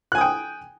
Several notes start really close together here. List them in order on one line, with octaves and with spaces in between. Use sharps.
F#6 G#5 D#6 G5